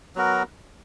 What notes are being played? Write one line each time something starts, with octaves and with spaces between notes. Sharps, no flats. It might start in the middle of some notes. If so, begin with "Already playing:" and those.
F#3 B3 F#4 A#4